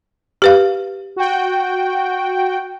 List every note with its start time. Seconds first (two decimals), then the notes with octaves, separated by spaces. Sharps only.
0.42 G4 B4 F5
1.16 F#4 G5